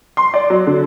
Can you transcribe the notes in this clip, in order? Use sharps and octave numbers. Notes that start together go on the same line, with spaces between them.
C6
D5
F#3
D3